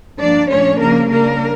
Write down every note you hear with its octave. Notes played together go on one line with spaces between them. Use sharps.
G2 F3 A#3 D4 D5
A#2 F3 A3 C#4 D4 C#5
C#3 F3 A#3 C#4 A#4
C#3 G3 A#3 D4 A#4